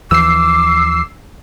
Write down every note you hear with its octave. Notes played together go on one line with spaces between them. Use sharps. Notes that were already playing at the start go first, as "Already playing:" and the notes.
D#2 E3 F3 D6 E6 C7